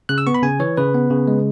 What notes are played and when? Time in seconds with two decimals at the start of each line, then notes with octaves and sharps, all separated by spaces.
0.09 C#3 F#6
0.18 E6
0.27 B3 C#6
0.34 B5
0.43 C#3 G#5
0.60 E3 C#5
0.77 C#3 B4
0.94 B3
1.10 C#3
1.28 G#3